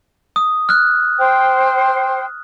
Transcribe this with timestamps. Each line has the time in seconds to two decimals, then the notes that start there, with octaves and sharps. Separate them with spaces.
0.36 D#6
0.69 F6 F#6
1.19 C5 G5